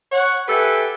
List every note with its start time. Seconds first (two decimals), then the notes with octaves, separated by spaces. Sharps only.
0.12 C#5 F#5
0.48 G4 A4 B4 E5 F#5 G#5